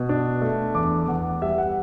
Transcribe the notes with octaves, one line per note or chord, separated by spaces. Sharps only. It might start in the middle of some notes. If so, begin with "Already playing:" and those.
Already playing: B2
D4
A3
E2 D6
E2 F#5
G3 E5
F#5